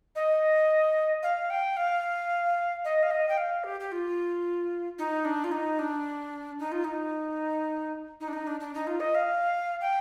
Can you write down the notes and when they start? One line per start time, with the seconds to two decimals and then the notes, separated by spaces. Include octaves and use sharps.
0.15 D#5
1.23 F5
1.50 G5
1.77 F5
2.85 D#5
3.03 F5
3.11 D#5
3.29 G5
3.37 F5
3.64 G4
3.80 G4
3.92 F4
4.98 D#4
5.25 D4
5.44 F4
5.51 D#4
5.79 D4
6.59 D#4
6.72 F4
6.84 D#4
8.20 D#4
8.28 D4
8.33 D#4
8.47 D4
8.60 D4
8.74 D#4
8.87 F4
9.00 D#5
9.15 F5
9.81 G5